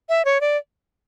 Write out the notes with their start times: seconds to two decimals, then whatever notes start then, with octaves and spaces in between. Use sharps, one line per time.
0.09 E5
0.25 C#5
0.41 D5